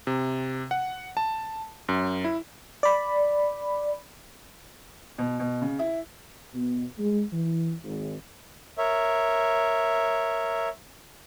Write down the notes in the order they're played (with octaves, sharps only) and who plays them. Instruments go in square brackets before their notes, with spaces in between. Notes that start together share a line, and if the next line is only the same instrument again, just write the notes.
[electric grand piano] C3
F#5
A5
F#2
E4
[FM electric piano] D5 B5
[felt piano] B2
B2
C#3
E4
[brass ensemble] B2
G#3
E3
G#1
[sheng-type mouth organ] A#4 C#5 E5